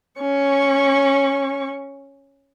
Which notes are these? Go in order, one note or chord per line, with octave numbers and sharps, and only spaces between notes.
C#4 C#6